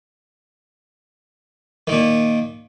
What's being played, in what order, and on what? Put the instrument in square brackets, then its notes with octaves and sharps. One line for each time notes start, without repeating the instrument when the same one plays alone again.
[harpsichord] A#2 D#3